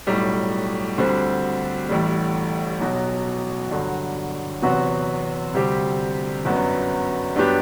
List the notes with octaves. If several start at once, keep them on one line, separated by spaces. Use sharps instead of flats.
B1 A2 G3
D2 D3 G3 C4
A1 A2 G3
B1 B2 F#3
G1 G2 D3 F#3
E2 C3 F#3 B3 F#4
D2 C3 G3 C4 G4
G1 F#2 F#3 B3
G2 F#3 B3 D4 G4